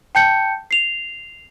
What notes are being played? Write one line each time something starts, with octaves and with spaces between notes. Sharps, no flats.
G5 A5 G6 C#7
C7 F7